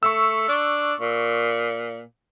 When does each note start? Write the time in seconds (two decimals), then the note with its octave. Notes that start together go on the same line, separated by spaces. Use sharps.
0.03 A3 C#6 E6
0.48 D4
1.00 A#2